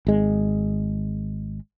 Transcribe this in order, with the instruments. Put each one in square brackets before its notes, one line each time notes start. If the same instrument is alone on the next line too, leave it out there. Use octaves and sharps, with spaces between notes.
[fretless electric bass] G#1 G#3